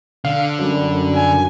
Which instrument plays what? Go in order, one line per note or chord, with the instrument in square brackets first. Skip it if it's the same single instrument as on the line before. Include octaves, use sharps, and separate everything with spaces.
[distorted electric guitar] D3 [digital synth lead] F5
[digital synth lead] F#2 [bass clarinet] G3
[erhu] G#5